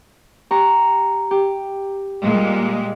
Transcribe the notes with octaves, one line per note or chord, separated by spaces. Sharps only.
G4 A#5 C#6
G4
A#2 G3 G#3